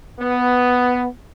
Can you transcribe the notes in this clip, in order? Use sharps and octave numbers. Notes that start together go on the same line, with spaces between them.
B3